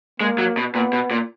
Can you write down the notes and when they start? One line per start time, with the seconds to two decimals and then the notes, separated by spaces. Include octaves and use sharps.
0.20 G#3 A#3
0.38 F#3
0.57 B2
0.75 A#2 B3
0.93 B2
1.11 A#2